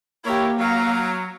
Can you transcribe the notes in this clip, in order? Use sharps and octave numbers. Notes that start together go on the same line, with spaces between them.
A#3 E4 G4 A#4 C#5
F#3 F5 A#5